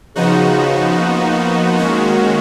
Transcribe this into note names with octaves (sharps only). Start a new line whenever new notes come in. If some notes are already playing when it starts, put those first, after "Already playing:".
C#3 F3 B3 D#4 F#4
A#3
D#3 G#3 C#4 F#4